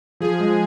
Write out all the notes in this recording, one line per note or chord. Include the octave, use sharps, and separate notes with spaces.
F3 G#4
G#3